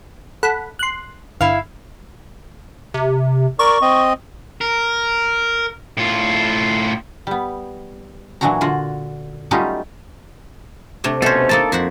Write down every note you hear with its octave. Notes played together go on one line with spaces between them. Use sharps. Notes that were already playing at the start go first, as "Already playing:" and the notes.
A4 F#5 B5
C6 F#6
G1 E4 F5 F6
C3
A#4 D5 C#6
C4 D#5
A#4
A2 F4
G3 B3
A#2 E3 F#3 D4 F#4 A#5
D3 F4 F#4
F#3 G3 A3 C#4 D#4 F4
C3 A3 D4
B2 A3 C#4 A4 C5
A3 A#3 D#4 A4 A5
F2 F#4 C5 F#5